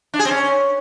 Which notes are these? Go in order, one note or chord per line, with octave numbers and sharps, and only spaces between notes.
D4
G#4
C4
C#4